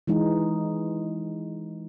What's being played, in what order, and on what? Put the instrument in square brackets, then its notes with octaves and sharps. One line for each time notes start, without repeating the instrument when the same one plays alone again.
[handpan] E3 G#3 D#4